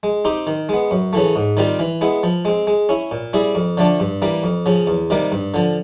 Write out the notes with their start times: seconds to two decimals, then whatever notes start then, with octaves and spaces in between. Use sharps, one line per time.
0.03 G#3
0.25 C4 D#4 G4 C5
0.47 D#3
0.69 G#3 B3
0.91 F#2
1.13 C#3 E3 A3
1.36 G#2
1.57 D#3 G3 C4 F4
1.79 E3
2.01 G#3 B3 E4
2.23 F3
2.45 G#3 C4
2.67 G#3
2.89 C#4 E4
3.11 A#2
3.33 G3 C4 E4 G#4
3.55 F2
3.77 D3 F3 A3 D4
4.00 G2
4.22 E3 G3 A#3
4.43 F2
4.66 C#3 F3
4.87 E2
5.10 C3 D#3 G3 A#3
5.32 G2
5.54 D3 F3